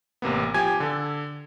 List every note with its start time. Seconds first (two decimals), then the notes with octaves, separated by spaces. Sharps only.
0.22 A1 C3 A#3 B3
0.54 F3 G4 G#5 G#6
0.80 D3 A4